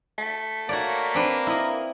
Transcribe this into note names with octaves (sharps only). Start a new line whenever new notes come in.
A3
A#3 F#4 C#5 D5
C4 D4 B4
E4 A#4 D#5